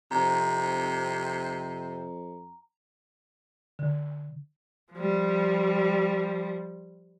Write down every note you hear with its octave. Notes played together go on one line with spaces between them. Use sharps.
F2 C3 A#5
D3
F3 G3